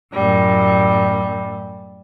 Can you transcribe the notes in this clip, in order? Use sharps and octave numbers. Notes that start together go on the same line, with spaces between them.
F#2 A2 G3